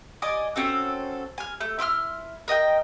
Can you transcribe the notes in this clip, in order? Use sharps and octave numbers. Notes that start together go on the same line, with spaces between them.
D5 D#5 G#5 D6
C4 C#4 F#4 A4
G#5 F6
A3
E4 C6 D6 F6
A#4 D#5 F#5 G5